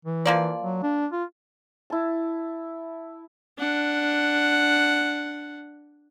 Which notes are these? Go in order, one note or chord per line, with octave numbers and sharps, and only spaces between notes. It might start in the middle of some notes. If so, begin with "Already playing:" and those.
E3
F3 A#3 D5
F#3
D4
F4
E4 A5
D4 F#5